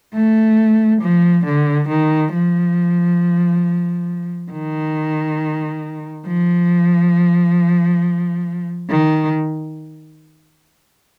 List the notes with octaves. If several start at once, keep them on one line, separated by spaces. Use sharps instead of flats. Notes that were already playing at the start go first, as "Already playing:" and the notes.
A3
F3
D3
D#3
F3
D#3
F3
D#3